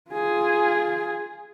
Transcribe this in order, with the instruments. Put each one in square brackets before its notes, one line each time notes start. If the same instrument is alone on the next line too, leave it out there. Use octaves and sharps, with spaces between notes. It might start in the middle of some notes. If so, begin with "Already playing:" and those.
[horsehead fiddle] F4 G#4